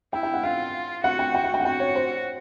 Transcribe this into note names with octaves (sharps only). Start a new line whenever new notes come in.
E4 G5
G5
F#5
F4 F5
F#4 F#5
G5
G5
F#5
G5
F#5
F#4 G5
C#5
C5